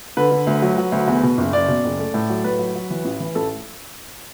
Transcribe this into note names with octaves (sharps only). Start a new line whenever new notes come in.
D3 B4
D3
D2
F#3
F#3
D2
E2
B2
F#1
F#1 D5
B2
F#1
A3
A2
F#3
A2 B4
F#3
F#3
E3
A1
E3
A1 A4